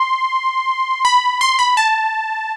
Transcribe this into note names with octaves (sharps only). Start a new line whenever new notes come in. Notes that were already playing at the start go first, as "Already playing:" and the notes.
Already playing: C6
B5
C6
B5
A5